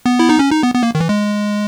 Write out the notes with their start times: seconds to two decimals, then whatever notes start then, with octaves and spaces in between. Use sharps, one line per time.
0.06 B3
0.19 E4
0.29 D#4
0.39 C#4
0.51 D#4
0.63 B3
0.75 B3
0.83 A#3
0.95 D#3
1.00 E3
1.09 G#3